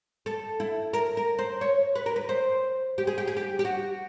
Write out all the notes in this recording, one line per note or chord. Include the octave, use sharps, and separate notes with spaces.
A4
E4
A#4
A#4
C5
C#5
B4
A#4
B4
C5
G4
G#4
G4
G#4
G4
G4
F#4